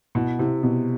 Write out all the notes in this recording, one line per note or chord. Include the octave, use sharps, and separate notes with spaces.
B2 E4
C3 E4
B2